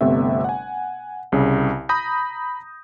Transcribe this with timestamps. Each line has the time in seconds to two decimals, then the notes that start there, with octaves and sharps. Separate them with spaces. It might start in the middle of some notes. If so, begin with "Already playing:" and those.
0.01 G1 C3 A3 B3 E5
0.44 F#5 G#5
1.32 C2 C#3
1.89 A#5 B5 D#6 G6 A#6